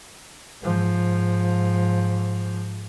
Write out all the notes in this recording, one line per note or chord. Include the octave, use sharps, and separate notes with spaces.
G#2 F3